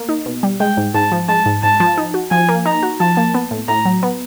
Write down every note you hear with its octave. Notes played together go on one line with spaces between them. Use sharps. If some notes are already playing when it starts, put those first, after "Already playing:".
Already playing: A#3
D#4
B2
G3
G#3 G5
G#2
G#2 A5
F3
G#3 A5
G#2
G#2 A5
F3
D#4
F#4
F3 G#5
A#3
D#4 A#5
F#4
F3 A5
A#3
B3
A2
A2 A#5
F#3
B3